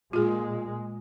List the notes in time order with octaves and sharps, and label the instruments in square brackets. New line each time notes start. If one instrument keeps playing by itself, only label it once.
[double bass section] A#2 G#3 [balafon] F4 G#4